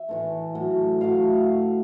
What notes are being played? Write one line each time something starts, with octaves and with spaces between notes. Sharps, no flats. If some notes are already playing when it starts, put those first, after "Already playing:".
Already playing: E5
A2 E3 A3
A2 F#3 A3
A2 F#3 A3 F5